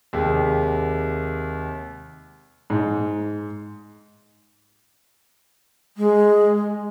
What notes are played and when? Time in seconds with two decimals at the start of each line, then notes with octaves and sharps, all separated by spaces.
0.13 D#2 C3 G#3
2.70 G#2
5.97 G#3